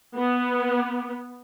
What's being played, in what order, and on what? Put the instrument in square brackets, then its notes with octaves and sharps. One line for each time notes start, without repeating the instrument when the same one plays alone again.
[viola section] B3